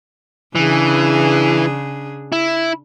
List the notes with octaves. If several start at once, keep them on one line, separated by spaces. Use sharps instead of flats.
C#3 E3 D4 G#4
E4